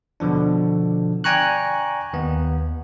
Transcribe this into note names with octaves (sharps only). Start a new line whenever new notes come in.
B2 D3 F3 D4
D5 G5 G#5 A#5 C#6 F#6
D#2 B3